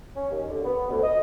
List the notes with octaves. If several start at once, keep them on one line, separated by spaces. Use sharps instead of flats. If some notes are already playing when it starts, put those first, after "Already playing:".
C#4
D#2
D3
B3
D2
D#5